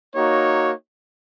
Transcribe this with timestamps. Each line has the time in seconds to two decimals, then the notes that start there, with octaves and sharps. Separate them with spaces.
0.15 A#3 D#4 F#4 C#5